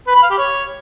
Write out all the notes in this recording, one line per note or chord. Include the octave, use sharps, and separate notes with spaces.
B4
B5
F5
G4
C#5